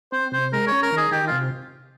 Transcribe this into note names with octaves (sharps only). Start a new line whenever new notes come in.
C4 C5
C3 C5
G#3 A#4
C#4 C#5
A#4
D#3
G#4
D#3 G4
C3 F4